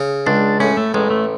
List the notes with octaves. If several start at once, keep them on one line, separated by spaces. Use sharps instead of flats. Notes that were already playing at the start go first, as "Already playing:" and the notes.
Already playing: C#3
C#2 D4
A2 C#4
A3
A1 G#3
A3